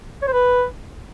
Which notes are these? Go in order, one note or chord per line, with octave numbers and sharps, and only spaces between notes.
C#5
C5
B4